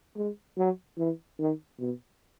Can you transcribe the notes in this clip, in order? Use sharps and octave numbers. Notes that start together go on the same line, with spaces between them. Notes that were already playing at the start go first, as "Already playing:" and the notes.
G#3
F#3
E3
D#3
B2